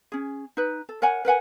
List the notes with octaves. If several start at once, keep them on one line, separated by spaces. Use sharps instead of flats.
C#4 G#4
D#4 B4
A4
A#4 C#5 F#5 G#5
A#4 B4 F#5 G#5